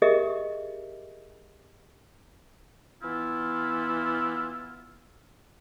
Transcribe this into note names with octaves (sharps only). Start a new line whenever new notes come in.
G4 G#4 A#4 D#5 E5
E3 B3 E4 F4